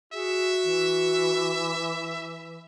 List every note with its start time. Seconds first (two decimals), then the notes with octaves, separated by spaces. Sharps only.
0.13 F#4 G#4 E5
0.64 E3